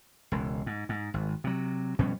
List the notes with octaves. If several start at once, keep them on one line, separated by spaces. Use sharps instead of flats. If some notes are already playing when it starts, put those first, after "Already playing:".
E1 C#2
G#2
G#2
G#1
C3 F#3
F2 B2 G3 C#4